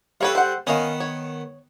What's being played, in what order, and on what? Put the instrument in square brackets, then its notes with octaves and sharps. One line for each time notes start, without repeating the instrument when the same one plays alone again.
[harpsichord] G3 A4 [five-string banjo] B4 C#5 F5
[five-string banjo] C5 F#5
[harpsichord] D#3 B3 [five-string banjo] C#4 D#5 F5
[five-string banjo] C#5